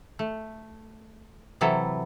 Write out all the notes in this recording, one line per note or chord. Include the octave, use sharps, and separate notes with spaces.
A3
C3 E3 F#3 E4 A4